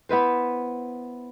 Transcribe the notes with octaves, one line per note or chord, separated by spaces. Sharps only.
B3 E4 B4 C5